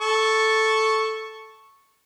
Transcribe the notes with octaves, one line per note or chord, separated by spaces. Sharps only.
A4 C#6